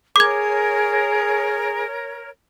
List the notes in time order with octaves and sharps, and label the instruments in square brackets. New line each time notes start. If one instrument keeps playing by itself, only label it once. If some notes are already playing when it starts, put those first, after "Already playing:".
[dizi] G#4 [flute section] A#4 C#5 [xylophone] D6 G#6